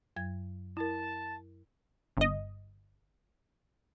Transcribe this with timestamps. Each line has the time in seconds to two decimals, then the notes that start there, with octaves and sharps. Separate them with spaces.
0.16 F#2 F#3 G#6
0.77 E4 A#4 A5
2.17 G1 D#5